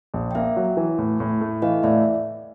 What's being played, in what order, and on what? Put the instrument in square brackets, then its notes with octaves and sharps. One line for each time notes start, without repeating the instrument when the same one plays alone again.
[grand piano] A#1
[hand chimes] G5
[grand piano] A#3 [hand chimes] E5 F#5
[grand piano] F#3
E3
A2
A2
A3
[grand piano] E3 [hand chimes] D#5 F5
[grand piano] A2 [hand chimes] D5 E5